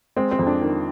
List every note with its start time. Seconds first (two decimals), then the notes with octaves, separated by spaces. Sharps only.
0.16 G#3 C4
0.31 C4
0.39 F2
0.47 D4
0.62 D#3